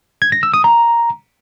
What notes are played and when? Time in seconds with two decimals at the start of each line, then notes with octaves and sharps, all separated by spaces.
0.22 G#6
0.32 A#6
0.43 E6
0.54 D#6
0.64 A#5